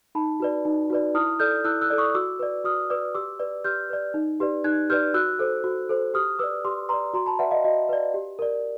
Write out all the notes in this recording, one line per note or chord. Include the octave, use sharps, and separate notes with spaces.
D#4 A5 B5
F#4 B4 D5
D#4
F#4 B4 D5
E4 D#6 F6
A4 D5 F6 G6
E4 E6 F#6
E6 F#6
A4 D5
C#6 D#6
F#4 D6 E6
B4 D5
F#4 D#6 F6
B4 D5 D6 E6
G4 D6 E6
B4 D5
G4 F6 G6
B4 D5
D#4
G4 B4 D5
D#4 F#6 G#6
G4 B4 D5 F6 G6
F#4 E6 F#6
A4 C5
F#4
A4 C5
G4 D#6 F6
B4 D5 D6 E6
G4 C6 D6
B4 D5 A#5 C6
F#4 A#5 C6
A5 B5
B4 D5 E5 F#5
D#5 F5
F#4 D#5
B4 D5
G4
A#4 D5